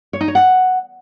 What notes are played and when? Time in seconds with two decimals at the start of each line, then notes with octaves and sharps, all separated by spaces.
0.13 C#5
0.21 D#4
0.28 C#5
0.35 F#5